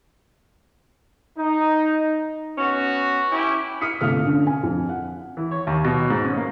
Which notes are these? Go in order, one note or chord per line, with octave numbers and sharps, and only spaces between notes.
D#4
B3 C#4 F#4
C#4 E4 G4
D#6 F6 B6 C#7
G1 C3 A3 F5 F6
D3 C#4
G#5
F2
F#5
E3
C#5
D#2
B2
G#2
C#4
A#3